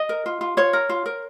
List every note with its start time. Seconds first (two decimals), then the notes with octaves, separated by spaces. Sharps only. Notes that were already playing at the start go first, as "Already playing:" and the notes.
Already playing: D#5
0.09 A#4
0.26 F4
0.41 F4
0.57 F4 C#5
0.73 A#4
0.89 F4
1.06 A#4